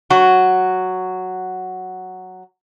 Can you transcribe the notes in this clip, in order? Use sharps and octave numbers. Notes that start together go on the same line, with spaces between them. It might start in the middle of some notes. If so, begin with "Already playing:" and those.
F#3 F#4